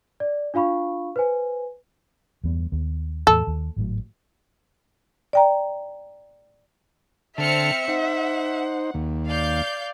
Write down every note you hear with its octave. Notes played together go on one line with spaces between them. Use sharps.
D5
D4 F4 F5 B5 C#6
B4 C5 G#5
E2 G2 B3
D#2 B3
E2 A2 A4
D#2
G#1 A2 F#3
D5 G5 A#5
D3 C4 E5 A5 F6 C#7
D#4 C5 F#5
D#2
D5 F5 G6